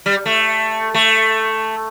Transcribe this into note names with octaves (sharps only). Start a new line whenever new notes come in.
G3
A3
A3